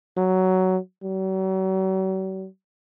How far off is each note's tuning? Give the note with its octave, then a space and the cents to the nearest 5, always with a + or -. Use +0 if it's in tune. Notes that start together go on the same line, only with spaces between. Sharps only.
F#3 +10
F#3 +45